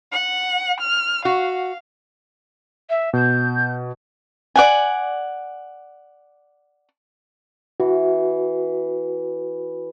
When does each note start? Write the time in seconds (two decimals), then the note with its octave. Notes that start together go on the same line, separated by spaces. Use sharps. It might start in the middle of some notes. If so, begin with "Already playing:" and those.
0.11 F#5
0.79 F6
1.25 F#4 F5
2.89 E5
3.13 B2 G6
4.56 D5 F#5 G#5
7.80 E3 F#4